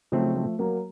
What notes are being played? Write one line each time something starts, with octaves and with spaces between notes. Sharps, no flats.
C#3 F3 F#3 A3 C4 D#4
F3 A3
F#3 A#3